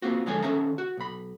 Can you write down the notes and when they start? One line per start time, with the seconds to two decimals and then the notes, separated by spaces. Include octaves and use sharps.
0.02 A#3 C4 F4 F#4
0.26 D3 F3 G#3 A4 C#5 G#5
0.43 D#3 C#4 A4 E5 A#5
0.78 F#4
0.97 B1 B5